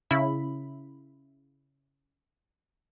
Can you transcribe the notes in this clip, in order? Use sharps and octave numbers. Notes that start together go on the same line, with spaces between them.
C#3 E4 B5